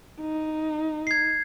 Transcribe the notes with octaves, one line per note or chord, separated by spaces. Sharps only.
D#4
G#6 C7